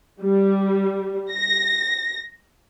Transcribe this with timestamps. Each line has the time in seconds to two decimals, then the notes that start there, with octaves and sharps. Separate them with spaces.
0.21 G3
1.32 A#6